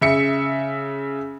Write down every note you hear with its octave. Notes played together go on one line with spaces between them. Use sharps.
C#3 E5 C#7